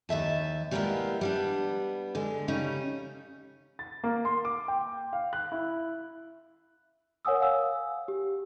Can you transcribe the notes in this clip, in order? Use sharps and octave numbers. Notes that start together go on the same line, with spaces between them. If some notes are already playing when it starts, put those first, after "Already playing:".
D#2 D#5 E5 A5
G3 G#3 A#3 B3 E4 F4
G3 B3 D4
D3 G#3
C#3 G3 C#4 D#4
A6
A#3
C6
D6
G5
F5
F#6
E4
A#4 C#5 F#5 G#5 D#6 E6
F5 G#5 E6
G4